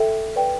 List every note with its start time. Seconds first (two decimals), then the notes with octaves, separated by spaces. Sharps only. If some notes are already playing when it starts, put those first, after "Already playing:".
Already playing: A4 E5 G5
0.36 B4 D5 G5